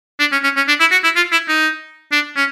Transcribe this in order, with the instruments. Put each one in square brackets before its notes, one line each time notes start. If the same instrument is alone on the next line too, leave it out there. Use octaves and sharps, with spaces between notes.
[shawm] D4
C#4
C#4
C#4
D4
E4
F#4
E4
F4
E4
D#4
D4
C#4